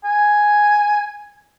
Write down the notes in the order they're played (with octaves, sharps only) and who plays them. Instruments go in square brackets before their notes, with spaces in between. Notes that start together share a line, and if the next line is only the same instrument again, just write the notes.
[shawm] G#5